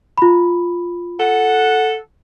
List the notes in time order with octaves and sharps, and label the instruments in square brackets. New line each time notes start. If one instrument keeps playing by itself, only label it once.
[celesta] F4 B5
[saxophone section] A4 F#5